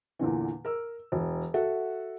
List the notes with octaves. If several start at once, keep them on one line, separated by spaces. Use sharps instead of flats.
E2 A#2 D3 E3
A#4 E6
E1
F#4 A4 E5 F#5